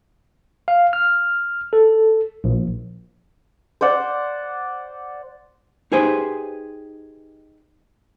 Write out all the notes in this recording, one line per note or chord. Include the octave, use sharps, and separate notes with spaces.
F5
F6
A4
A#1
C5 D5 F#5
D#4 G4 G#4 B4 C5